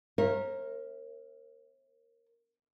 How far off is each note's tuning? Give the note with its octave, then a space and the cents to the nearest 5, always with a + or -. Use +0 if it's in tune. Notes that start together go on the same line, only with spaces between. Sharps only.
A#4 +0 C#5 -45 E5 -20